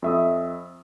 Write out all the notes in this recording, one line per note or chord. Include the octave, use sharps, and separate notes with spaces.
F2 E5 D#6